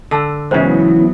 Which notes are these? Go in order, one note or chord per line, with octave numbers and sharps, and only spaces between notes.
D3 A5 E6
G#2 C#3 E3 F#3 B3 C5